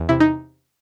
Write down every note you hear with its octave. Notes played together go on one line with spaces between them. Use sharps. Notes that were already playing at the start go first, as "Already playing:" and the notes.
Already playing: E2
C3 E4
D#4